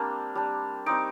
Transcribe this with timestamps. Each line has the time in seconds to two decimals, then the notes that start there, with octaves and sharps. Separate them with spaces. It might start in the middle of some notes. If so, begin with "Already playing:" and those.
Already playing: G3 A#3 C4 D4 C6
0.35 G3 D4
0.86 G3 C4 D#4 D6